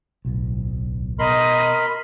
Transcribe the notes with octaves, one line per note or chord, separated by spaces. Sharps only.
D1 B1
B2 A#4 D#5 B5 C6